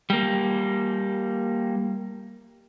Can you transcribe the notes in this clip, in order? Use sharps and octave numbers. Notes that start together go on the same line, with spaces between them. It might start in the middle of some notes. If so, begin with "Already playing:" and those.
G3 A#3